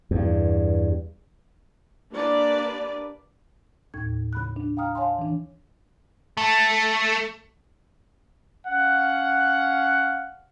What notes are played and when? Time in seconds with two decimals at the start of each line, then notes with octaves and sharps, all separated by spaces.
0.11 E2 G2
2.12 A#3 D4 G4 B4 D5
3.94 D#2 A2 G#6
4.33 C#3 B5 F#6
4.56 D4
4.77 F5 G5 A#5 D#6 F6
4.95 C#5 F5 G#5 A5 C6
5.18 E3 D4
6.37 A3
8.68 C#4 F5 F#5